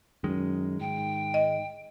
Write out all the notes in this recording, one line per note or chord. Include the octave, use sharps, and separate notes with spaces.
F#2 D#3 G#3
G#2 G5
D#5